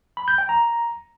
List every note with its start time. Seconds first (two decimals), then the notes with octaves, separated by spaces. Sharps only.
0.17 B5
0.28 G6
0.38 G5
0.49 A#5